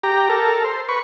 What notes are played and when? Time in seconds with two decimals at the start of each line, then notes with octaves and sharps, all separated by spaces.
0.03 G4 A#5
0.30 A4 A#4
0.64 C5
0.89 B4 C#6